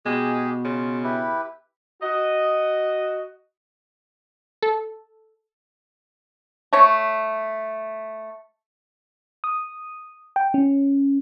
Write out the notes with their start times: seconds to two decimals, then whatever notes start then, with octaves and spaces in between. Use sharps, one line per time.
0.06 B2 G#3 G4 G#4
0.65 C#3 F4
1.04 E4 G4 B4
2.03 F#4 D#5
4.63 A4
6.73 A3 C#5
9.44 D#6
10.36 G5
10.54 C#4